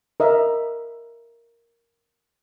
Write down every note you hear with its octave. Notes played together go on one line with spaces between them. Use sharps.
A#4 D#5 E5